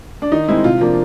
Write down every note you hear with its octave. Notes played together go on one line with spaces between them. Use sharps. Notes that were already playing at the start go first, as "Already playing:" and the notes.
D4
D#3 D#4
G#3 C4 E4
C3 F4
F3 A#3 D4